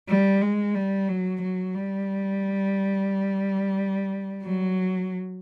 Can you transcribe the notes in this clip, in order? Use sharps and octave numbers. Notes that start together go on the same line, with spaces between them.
G3
G#3
G3
F#3
F#3
G3
F#3